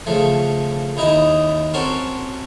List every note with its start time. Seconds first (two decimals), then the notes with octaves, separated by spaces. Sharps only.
0.06 C#3 F3 A3
0.97 D#2 D#4 E4 D#5
1.74 C4 C#4 F#4 A#4 A5